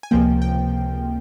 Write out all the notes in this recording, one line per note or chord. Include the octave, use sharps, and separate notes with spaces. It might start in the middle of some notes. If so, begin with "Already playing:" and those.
G#5
C#2 C3 F3 A#3 G5
G5